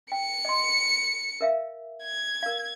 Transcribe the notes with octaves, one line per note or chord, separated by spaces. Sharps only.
G5 C#7
D#5 C6
A#4 E5 F5
G#6
A#4 F5